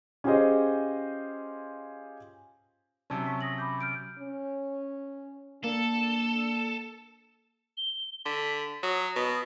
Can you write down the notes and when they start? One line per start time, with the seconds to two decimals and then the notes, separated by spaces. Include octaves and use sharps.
0.24 C#4 F4 G4 G#4 C5 D#5
3.10 C3 F#3 C#4 A5
3.26 C#6 B6
3.41 D#6 A#6 F#7
3.58 B5 D6 G6
3.81 F6 G6 D7
4.19 C#4
5.64 A#3 D4 A4
7.77 G7
8.26 D3 B6
8.83 F#3 D#6
9.16 B2